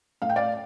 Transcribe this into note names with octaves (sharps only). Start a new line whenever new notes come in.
A2 F5
G5
D5 F5